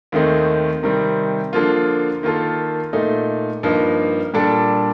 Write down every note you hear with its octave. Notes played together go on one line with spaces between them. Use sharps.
D#2 D#3 A3 C4 D#4
C3 D#3 G3 C4
D3 F3 A#3 F4
D#3 A#3 F4 A4
A#2 A3 D#4
G2 F3 A#3 D#4
A#2 G3 D4 A4